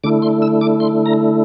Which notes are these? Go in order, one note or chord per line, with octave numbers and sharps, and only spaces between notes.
D3 A3 E4 D6
C6
E6
D6
C6
A#5